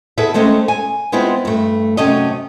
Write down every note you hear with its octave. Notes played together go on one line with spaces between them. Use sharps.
B3 E4 G#4 A4 B4 E5
G#3 A3 C4 C#4 A4
G#5
G#3 B3 C4 E4 F4 G#4
G2 A3
F#2 C3 A3 C#4 D#5